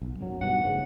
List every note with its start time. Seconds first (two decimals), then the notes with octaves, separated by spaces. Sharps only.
0.02 B1
0.19 G#1 F#2 F#3
0.41 G2 B2 D#3 F#5
0.65 A1 G#2 C#3